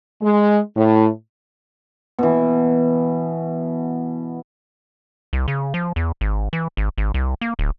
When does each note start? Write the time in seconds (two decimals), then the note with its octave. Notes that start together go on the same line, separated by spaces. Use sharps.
0.22 G#3
0.77 A2
2.19 B2 E3
5.33 C2
5.48 C#3
5.74 F3
5.96 E2
6.21 G#1
6.53 E3
6.77 G#1
6.98 G#1
7.14 C2
7.41 A#3
7.59 D1